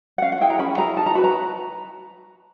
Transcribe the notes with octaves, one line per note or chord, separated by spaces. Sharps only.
F#5
C#4 F5
F#5
E4 G#4 G5
A#5
C#4 B5
E4 G#4 A#5
D#4 A5
A#5
F#4 B4 B5
A#5